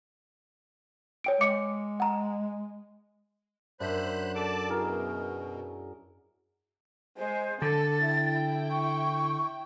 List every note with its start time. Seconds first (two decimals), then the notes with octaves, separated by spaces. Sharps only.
1.24 C#5 G5 D7
1.41 G#3 F5 D6 C#7
2.00 F#5 A#5
3.80 F#2 D4 C5 E5 B5 F#6
4.35 A4 D5 A5 D6
4.69 B2 E4 G#4 A#4
7.17 G#3 C5
7.62 D3 A4 A6
8.07 E4 G5
8.71 C#6